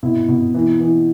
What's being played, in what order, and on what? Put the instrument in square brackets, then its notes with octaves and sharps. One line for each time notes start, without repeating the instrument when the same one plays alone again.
[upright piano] B2 E4
B2
E3
E3